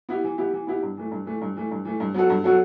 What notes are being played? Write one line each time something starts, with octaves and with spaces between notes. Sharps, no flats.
B3 E4 G4
E3
B3 E4 G4
E3
B3 E4 G4
G2
E3 A3
G2
E3 A3
G2
E3 A3
G2
E3 A3
G2
F#3 B3 F#4 A4
G2
F#3 B3 F#4 A4